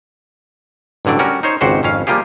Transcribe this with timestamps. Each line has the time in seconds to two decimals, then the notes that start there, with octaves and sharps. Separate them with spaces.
1.05 A1 G2 D3 F#3 D5
1.19 G3 C#4 F#4 A#4
1.43 D#4 C5 C#5
1.61 G#1 C#2 G#2 F#4 G4 C5
1.83 G#1 F2 C#4 F5
2.07 F3 G3 A#3 F4 G4 G#4